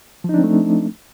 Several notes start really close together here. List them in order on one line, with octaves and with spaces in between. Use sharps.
F3 D#4 D4 C4 A3